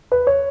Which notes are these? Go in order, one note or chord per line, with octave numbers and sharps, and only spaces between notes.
B4
C#5